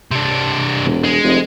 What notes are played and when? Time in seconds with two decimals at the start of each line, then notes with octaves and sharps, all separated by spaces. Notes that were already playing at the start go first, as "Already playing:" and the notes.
0.11 C3 D4
0.85 E1
1.04 G#3
1.24 F1